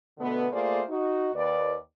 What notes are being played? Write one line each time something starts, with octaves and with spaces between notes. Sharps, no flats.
B2 D3 A3 B3
A3 A#3 F4 G#4 C5 D5
D#4 F#4
D#2 B4 D5